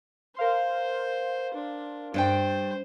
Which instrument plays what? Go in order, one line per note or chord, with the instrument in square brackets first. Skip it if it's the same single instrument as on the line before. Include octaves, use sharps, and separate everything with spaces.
[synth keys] A#4 F5 C6 [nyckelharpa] C5
[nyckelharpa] D4
[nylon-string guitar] G2 D4 G5 [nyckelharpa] C5